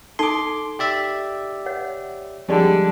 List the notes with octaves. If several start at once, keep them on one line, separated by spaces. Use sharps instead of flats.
D#4 A4 A5 C6 D6
G4 D5 E5
C#5 F#5
F2 D3 G3 G#3